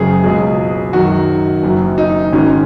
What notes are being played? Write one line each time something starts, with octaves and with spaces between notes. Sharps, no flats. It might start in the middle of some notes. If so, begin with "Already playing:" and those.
Already playing: F#1 F#2 C#3 G#3 C#4 G#4
C#2 B2 F#3 G#4
F#2 D#3 F#3 F#4
F#1 F#2 F#3
D#4
G#1 G#2 D#3 G#3 C#4